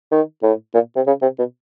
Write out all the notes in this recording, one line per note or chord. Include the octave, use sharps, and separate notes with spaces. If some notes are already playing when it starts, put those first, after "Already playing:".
D#3
A2
A#2
C3
C#3
C3
B2